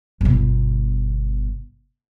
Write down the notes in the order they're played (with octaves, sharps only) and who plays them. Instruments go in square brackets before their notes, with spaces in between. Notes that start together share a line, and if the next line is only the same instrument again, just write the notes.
[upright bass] G1 B2